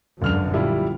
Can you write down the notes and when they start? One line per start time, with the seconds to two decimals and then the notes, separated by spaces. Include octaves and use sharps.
0.22 G1 C#2 F#2 D3 F6 F7
0.54 A#1 G3 E4 F4